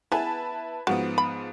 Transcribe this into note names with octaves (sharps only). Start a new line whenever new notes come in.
B3 E4 G#4 B4 A5
G#2 F3 B3 F#4
B5